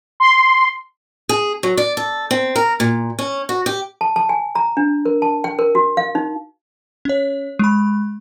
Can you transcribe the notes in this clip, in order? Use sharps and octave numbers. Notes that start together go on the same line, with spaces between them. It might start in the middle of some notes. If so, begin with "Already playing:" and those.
C6
G#4
F#3
D5
A4
C4
A#4
A#2
C#4
F#4
G4
A5
A5
G#5
A#5
D4
A#4
A5
G5
A#4
F#4
F5
D#4
C#4 C#5
G#3 B5